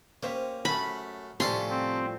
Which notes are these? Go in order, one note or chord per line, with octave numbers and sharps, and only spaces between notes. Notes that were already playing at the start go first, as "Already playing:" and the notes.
A#3 C#4 G4 C5
F#2 A3 B5
A2 C3 F3 G3 C#4 A4 C6
C4